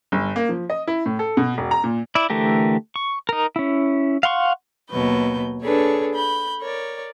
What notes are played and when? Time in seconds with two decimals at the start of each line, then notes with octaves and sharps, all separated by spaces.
0.12 G1
0.36 A#3
0.49 F3
0.70 D#5
0.87 E4
1.06 A2
1.19 A4
1.37 B2
1.58 E1
1.71 A#5
1.84 A#2
2.15 E4 D5
2.30 D3 E3 A3 G4 A#4
2.96 C#6
3.29 D#4 A#4
3.56 C#4 E4
4.23 F5 F#5 C6 C#6
4.90 D#2 B2 F#3 B4 G6
5.63 D4 G#4 A4 B4 C#5
6.14 B5 G6
6.60 A#4 C#5 D5